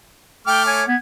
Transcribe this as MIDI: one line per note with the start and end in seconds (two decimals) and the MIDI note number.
0.47 0.83 57
0.47 0.65 79
0.47 0.83 86
0.47 0.83 89
0.67 0.85 73
0.67 0.87 80
0.87 0.95 59
0.87 0.97 92